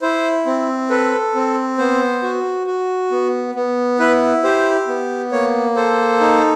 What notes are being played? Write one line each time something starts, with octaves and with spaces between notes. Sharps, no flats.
E4 C5
C4
A4 B4
C4
B3 C5
F#4
F#4
B3
B3
E4 B4
G4 C5
B3
A#3 C#5
A4 C5
D#4